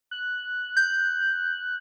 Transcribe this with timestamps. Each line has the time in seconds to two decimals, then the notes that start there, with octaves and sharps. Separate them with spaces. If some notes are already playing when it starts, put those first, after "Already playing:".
0.11 F#6
0.77 G6